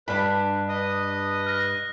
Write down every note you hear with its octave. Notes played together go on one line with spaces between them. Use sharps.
G2 D4 B4 B5
B4 D#5 D#6
F6 A#6